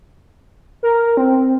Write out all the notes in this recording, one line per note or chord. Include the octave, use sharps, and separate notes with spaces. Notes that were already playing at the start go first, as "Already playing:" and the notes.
A#4
C4